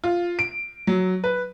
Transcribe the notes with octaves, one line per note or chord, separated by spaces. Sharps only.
F4
D7
F#3
B4